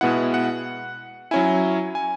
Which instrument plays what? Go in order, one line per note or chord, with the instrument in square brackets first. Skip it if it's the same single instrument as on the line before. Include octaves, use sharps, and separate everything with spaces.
[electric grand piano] B2 G#3 B3 E4 F#5
F#5
F#3 C#4 E4 G#5
G#5